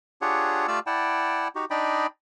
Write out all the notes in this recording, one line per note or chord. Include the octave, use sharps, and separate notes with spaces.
D4 F4 G4 G#4 C#5 F#5
A3 F4 G4 D5 F5 E6
E4 D5 F#5 G5 A5
D#4 F#4 G4
D4 D#4 D5 D#5 G5 B5